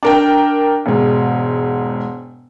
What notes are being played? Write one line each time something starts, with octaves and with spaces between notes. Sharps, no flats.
D4 A#4 G5
E1 G#2